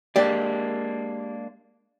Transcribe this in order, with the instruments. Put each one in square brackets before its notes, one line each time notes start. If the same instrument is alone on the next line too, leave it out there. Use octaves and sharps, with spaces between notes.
[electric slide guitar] G#3 A#3 D4 [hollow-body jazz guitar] G4 D5